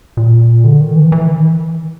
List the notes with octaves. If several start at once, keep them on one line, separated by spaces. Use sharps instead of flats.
A#2
D3
D#3
E3
E3
D#3